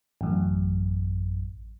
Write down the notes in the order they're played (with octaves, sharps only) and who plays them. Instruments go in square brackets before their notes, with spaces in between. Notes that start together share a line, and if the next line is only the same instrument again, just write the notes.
[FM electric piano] A1 F#2